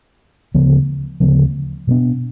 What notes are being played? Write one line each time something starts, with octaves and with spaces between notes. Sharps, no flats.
D2 C#3 F3 B3
D2 C#3 F3 B3
B2 G#3 B3 D4